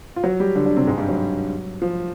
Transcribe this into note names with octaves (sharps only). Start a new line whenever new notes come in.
F4
F#3 F#4
G3 G4
D3 D4
D3 D4
C3 C4
G#2 G#3
G2 G3
F#3
F3